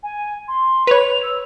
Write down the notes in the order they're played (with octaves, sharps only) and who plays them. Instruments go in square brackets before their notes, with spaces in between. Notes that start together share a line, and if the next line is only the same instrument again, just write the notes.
[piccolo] G#5
C6
[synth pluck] B4 C#5 [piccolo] F7
[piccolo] E6